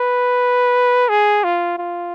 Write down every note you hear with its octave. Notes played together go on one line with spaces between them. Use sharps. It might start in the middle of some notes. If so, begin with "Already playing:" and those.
Already playing: B4
G#4
F4
F4